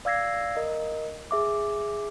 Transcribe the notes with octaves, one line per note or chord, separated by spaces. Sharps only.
D5 F5 E6 G#6 A#6 C7
A#4 D#5
G#4 E5 D6